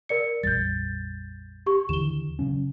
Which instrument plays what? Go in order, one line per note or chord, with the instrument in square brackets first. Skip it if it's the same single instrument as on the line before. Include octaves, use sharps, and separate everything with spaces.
[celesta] A#4 D5 C#7
[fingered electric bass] A#1 F2 G3 [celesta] G6 A6
[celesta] G4 C#6
[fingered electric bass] D#2 D3 E3 [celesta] E7 G7
[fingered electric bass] C#3 F#3 C#4